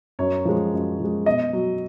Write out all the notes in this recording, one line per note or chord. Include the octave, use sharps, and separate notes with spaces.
F#2 C#5
F3 G#3
F#2
F3 G#3
B2 D#5
F#3